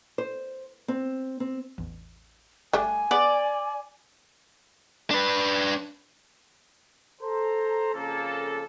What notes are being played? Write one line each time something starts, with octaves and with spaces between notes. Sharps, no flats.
C5
C4
C4
A1 E2
G1 G3 A3 D4 G4 G#5 D6
B3 G#4 D5
D4 B4
A4 C5 A#5
F2 C#3 A#3 A4